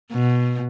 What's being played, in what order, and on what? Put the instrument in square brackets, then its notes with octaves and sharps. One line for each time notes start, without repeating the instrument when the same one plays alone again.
[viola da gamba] B2